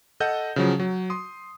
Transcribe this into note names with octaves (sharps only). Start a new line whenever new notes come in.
A4 D#5 F#5 G6
C#3 F3 F#3
F#3
C6 D#6